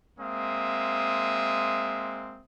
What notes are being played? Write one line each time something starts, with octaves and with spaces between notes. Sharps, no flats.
G#3 A#3 C4 E5 D#6